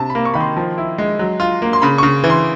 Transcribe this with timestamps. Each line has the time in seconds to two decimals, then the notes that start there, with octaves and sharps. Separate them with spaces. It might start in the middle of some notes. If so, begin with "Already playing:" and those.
Already playing: C3 A5
0.10 B5
0.15 A#3
0.25 C#6
0.34 D#3 B5
0.41 C6
0.57 F3
0.78 E4
0.98 G#3
1.19 F#3
1.40 F4
1.62 A#3
1.73 C6
1.82 C#3 B5
1.98 C#3 C#6
2.24 E3
2.30 C6